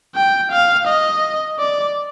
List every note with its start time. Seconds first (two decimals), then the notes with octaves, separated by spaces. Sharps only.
0.16 G5
0.51 F5
0.87 D#5
1.59 D5